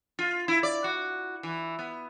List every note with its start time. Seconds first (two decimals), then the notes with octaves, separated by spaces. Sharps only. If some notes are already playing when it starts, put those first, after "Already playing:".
0.19 F4
0.48 E4
0.63 D5
0.84 F#4
1.43 E3
1.79 B3